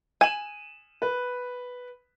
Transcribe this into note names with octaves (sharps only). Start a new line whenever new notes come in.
G#5 D#7 E7 F#7
B4